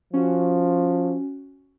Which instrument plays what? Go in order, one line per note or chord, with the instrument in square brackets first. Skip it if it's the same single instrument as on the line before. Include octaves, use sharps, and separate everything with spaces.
[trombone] F3 [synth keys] C#4 F#4